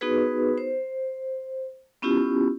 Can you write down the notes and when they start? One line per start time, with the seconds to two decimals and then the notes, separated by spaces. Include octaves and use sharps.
0.01 B3 D#4 F#4 G#4 B4
0.58 C5
2.02 B3 C#4 E4 F4 G4